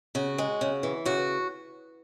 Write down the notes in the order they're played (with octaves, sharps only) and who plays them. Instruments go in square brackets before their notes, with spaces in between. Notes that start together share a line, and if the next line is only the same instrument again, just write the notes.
[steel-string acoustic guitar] C#3 F#4
G#3
C#3
E3
C#3 F#4